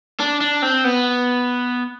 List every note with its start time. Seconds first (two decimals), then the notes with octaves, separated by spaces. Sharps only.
0.20 D4
0.41 D4
0.62 C4
0.84 B3